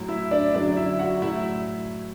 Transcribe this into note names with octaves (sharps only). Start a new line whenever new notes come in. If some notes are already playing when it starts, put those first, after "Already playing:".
Already playing: A2 F#3
E4 E5
D4 D5
F#2 D3 F#3 D4 D5
E4 E5
F#4 F#5
A2 F#3 E4 E5